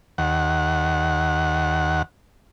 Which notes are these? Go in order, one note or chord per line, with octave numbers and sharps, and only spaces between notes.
D#2 F#5